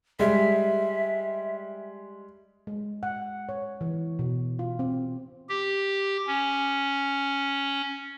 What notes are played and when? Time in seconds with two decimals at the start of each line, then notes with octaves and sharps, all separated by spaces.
0.19 G3 G#3 E5
2.67 G#3
3.03 F#5
3.49 C#5
3.81 E3
4.19 B2
4.59 F4
4.79 C4
5.49 G4
6.27 C#4